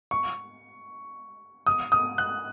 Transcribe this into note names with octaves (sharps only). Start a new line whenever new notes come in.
C#6
D#6
D#6
F#6